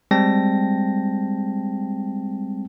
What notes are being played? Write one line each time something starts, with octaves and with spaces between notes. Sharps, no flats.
G3 G#3 C4 G5 A5 A#6